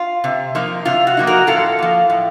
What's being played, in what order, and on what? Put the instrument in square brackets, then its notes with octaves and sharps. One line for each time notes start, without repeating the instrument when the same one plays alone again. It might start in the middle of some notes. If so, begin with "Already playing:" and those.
Already playing: [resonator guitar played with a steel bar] F4
C3
F3 A#3 D#4
C3 F4
F#4
F3 A#3 D#4
F#4 A#4
A2 F4 A4
F3 A#3
A2